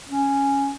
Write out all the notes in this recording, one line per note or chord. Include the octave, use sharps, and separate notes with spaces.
C#4